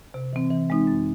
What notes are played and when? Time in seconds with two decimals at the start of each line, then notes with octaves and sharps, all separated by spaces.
0.14 C3
0.33 E3 C4
0.50 E3
0.70 G#3 C4 D#4
0.87 F#2